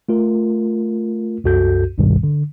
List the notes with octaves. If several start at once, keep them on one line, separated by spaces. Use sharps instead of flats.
A3 F4 A#4
C2 F#2 F#4 A4 G6
G#1 C#2 G2 B2 D#3 G3
D3